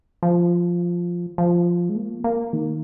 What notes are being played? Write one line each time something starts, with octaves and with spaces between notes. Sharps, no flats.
F3
F3
G#3
A#3
A#3
D#3